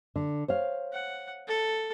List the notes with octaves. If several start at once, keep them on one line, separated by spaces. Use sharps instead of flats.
D3
C5 C#5 F5
F#5
A4